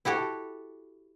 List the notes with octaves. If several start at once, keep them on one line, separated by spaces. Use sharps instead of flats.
E4 F#4 G4 A4